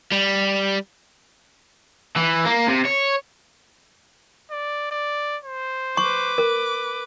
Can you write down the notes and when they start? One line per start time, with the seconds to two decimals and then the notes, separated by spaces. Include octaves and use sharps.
0.12 G3
2.17 E3
2.46 A#3
2.68 C3
2.85 C#5
4.51 D5
4.91 D5
5.44 C5
5.97 B4 C#6 D6
6.38 A#4